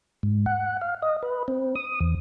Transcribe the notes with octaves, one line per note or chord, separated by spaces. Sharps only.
G#2
F#5
F5
D#5
B4
C4
D#6
E2